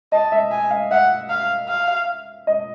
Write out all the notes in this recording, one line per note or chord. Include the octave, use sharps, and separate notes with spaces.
D#5 A5
E5
G#5
F5
E5 F#5
F5
F5
D#5